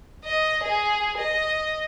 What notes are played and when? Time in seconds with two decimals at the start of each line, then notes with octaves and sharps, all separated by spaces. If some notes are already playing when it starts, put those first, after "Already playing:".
0.24 D#5
0.63 G#4
1.18 D#5